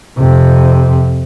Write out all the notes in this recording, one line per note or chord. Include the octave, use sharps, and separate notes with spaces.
F2 C3